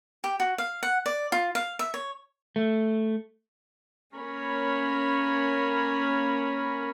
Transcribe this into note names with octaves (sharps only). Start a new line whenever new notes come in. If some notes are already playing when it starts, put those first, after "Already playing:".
G4
F#4
F5
F#5
D5
F4
F5
E5
C#5
A3
A#3 C#4 A#4 C#5 B5